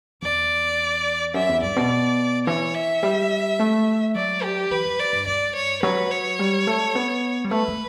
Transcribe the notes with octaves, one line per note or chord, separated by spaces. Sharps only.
E2 D5
F#2 E5
E2
G2 D5
B2
E3 C#5
E5
G3
A3
F#3 D5
G4
E3 B4
F#2
D5
G2
G2 D5
C#5
F#3 B4
C#5
G3
A3
B3
G3
A3 B4
A3